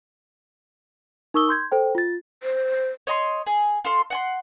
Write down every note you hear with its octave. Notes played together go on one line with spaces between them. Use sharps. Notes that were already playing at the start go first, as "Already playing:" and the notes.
D#4 A#4 C#6 D#6 E6 G7
C6 G6 G#6
A4 C5 G5
F4 A6
C5
C#5 D#5 A#5 C6
G#4
F4 A4 C6
F#5 G#5 C6